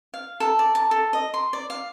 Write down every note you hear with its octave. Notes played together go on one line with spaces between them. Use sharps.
F5
A4
D5
A5
A4
D#5
C6
D5
F5